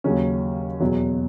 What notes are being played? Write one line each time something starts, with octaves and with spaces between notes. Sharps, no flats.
D#2 C#3 F#3 C#4
E2 B2 F#3